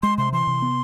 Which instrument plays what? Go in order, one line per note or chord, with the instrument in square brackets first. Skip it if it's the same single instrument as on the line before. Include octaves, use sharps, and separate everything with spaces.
[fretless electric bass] G#3 [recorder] C6
[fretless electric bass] C3 [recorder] C6
[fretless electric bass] E3 [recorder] C6
[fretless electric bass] C3
B3